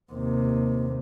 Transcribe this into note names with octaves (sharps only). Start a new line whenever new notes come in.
D#2 C3